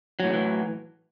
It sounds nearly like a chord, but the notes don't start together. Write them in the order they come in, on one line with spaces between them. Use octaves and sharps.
F#3 A2 D3 E3